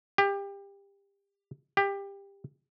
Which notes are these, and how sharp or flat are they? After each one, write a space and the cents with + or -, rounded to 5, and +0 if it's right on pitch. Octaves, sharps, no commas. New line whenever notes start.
G4 +25
G4 +20